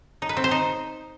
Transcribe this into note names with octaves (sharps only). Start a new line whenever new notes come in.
D#4
B4
C4
C5
D#4